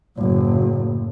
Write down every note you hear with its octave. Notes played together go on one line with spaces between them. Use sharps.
F#1 A2